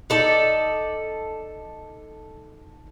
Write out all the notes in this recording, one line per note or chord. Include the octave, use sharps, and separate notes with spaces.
D#4 A4 D5